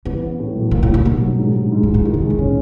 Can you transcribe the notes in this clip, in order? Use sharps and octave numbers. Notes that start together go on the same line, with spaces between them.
E3 B3
B3
A2
B1
A#2 A#3
A2
A#2 D#3
B2 D#3
F#3
G#2
G#2
G#2
A2
E3
A2
A2 D#3
C3
G#3
B2
A#2 C#4